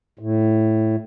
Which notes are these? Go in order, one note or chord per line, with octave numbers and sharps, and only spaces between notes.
A2